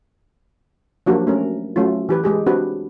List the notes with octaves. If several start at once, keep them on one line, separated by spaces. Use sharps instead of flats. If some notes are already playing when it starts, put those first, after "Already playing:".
F3 F#3 A#3 D4 F#4 G4
A3 C#4 A#4
F#3 A3 C#4 F4
E3 G4 B4
G#3 G4 G#4
C4 D4 F#4 G4 B4